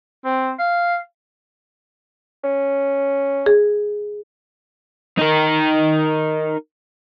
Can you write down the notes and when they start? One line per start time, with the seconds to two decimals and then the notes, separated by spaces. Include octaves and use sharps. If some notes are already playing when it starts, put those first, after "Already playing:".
0.24 C4
0.59 F5
2.44 C#4
3.46 G#4
5.19 D#4 A#4